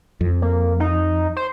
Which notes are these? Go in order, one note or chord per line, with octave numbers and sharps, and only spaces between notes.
F2
A#3
D#4
C5